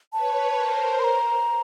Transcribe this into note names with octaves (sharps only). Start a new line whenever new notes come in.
B4 C#5 A5
A#4 C5
C6
A#5